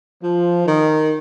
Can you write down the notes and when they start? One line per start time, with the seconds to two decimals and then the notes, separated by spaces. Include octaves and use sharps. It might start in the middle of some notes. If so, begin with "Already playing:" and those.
0.22 F3
0.67 D#3